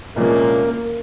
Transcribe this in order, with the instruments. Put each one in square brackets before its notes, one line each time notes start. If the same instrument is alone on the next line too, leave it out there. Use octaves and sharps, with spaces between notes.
[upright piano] C2 A#2 F3 G#3 C#4 [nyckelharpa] A#3